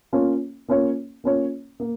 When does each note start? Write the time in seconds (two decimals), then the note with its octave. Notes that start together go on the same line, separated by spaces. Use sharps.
0.13 A#3 C#4 F4 C#5
0.68 A#3 C#4 F4 C#5
1.24 A#3 C#4 F4 C#5
1.80 A#3